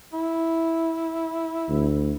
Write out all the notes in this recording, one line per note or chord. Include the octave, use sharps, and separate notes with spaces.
E4
D2